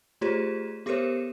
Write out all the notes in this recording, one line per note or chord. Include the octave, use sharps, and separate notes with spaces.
A3 F4 G4 G#4 C5 C#5
B3 G4 A4 A#4 C5 C#5